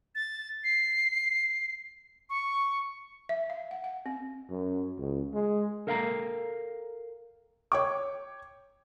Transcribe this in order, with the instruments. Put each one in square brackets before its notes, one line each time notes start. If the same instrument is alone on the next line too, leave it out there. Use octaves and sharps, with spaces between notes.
[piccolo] A6
C7
C#6
[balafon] E5
F5
F#5
F#5
C4
[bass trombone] F#2
C#2
G#3
[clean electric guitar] A4 A#4 F5 G5 G#5 A#5
[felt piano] C#5 G5 D6